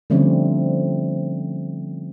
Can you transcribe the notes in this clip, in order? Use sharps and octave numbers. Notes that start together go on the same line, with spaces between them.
D3 F3 G3 A3 C4 C#4